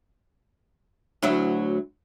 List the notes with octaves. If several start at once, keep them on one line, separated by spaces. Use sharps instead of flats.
D2 F#3 E4